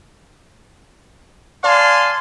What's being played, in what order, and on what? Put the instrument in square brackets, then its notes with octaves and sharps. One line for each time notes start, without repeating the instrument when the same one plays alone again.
[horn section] D5 F5 G#5 A5 C6